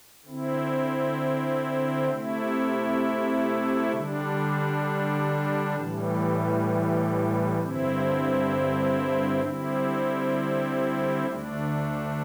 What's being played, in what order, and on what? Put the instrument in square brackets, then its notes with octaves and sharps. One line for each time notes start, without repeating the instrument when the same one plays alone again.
[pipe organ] D3 C4 E4
C3 A3 E4
D3 G3 D4
A2 E3 G3
G2 D3 C4 E4
D3 G3 C4 E4
D2 D3 A3 D4